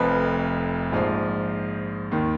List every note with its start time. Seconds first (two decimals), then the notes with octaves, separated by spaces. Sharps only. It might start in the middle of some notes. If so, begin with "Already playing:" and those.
Already playing: F1 F2 F3 B4
0.92 A#1 G#2 F3
2.12 D#2 D#3